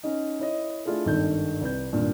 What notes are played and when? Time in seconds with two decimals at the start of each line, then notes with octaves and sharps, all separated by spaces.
0.03 C#4 D#4
0.40 E4 C#5 D#5
0.85 A3 D4 E4 F4 G#4 A4
1.05 G#1 G2 D#3 D#4 A4 G6
1.61 C2 B4 G6
1.92 G#1 G2 A#2 D4